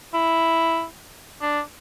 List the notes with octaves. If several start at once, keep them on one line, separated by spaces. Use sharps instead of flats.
E4
D4